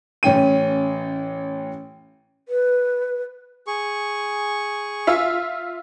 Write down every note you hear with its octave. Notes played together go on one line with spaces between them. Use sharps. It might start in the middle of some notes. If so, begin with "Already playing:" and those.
A1 C#4 G5 D#7
B4
G#4 C#6
F4 E5